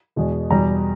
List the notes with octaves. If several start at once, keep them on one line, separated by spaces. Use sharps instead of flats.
E2 B2 G#3
E2 B2 G3 A#5